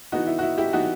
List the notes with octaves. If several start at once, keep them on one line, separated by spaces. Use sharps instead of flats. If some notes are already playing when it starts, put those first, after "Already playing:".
E3 B3 D#4 F#4
E4
F#4
E4
E4 G4
E3 B3 D#4 F#4